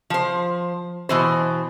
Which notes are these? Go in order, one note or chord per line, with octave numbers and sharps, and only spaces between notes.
F3 C5
B2 E3 C5